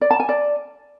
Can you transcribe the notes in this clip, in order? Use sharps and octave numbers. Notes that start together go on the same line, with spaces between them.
D5
A5
G#5
D5